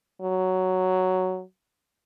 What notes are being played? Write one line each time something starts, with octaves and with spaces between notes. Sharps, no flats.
F#3